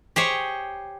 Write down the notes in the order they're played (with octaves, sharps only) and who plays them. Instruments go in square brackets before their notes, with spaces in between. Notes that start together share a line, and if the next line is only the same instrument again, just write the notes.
[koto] G4 G#4 C5 C#5